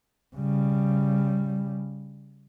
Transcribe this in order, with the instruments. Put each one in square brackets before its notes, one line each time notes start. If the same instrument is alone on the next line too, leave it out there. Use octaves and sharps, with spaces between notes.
[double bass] C#3 G3